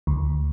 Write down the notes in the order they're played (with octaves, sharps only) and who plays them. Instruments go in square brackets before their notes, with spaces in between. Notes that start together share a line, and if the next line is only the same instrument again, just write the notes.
[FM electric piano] D2